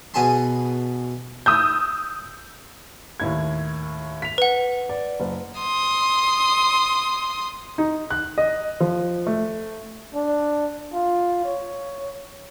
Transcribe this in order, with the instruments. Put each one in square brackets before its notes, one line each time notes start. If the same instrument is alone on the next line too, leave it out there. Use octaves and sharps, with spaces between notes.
[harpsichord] B2 B3 G#4 G#5 A5 C6
[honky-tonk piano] D#6 E6 G6
[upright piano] D#2 A2 G#6
B6 F7
[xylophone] B4 F#5
[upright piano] D5
F#1
[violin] C6 D#6
[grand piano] D#4
F#6
D#5
F3
A3
[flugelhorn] D4
F4
C#5